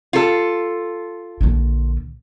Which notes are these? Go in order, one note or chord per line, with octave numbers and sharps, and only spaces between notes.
F4 A4
A#1 D3